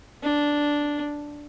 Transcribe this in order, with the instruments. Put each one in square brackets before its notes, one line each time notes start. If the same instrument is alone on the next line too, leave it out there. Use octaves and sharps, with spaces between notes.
[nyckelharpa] D4